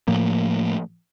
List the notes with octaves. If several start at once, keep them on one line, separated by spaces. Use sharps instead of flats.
A2 F3 A#3